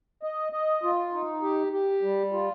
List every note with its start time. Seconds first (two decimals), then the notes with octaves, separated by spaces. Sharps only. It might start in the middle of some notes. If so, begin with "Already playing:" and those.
0.23 D#5
0.53 D#5
0.83 F4
1.13 D#4
1.42 G4
1.72 G4
2.02 G3
2.33 F4